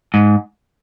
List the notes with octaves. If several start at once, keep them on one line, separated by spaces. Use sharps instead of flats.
G#2